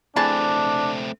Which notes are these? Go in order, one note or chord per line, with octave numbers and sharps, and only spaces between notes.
E3 A3 C4 D4 G#4 A5